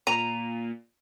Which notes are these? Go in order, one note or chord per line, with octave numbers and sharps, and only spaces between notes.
A#2 A#5 D#7 F7